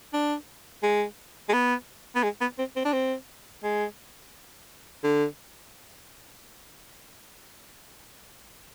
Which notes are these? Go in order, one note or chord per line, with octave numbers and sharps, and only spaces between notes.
D4
G#3
G#3
B3
B3
G#3
B3
C4
C4
D4
C4
G#3
D3